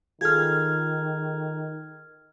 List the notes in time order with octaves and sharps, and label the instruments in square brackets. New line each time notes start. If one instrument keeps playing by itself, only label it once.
[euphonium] D#3 [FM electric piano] F4 G#4 A4 [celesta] F6 G#6